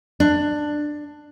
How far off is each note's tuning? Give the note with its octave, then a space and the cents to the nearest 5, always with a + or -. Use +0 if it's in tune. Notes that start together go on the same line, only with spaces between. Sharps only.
D4 +15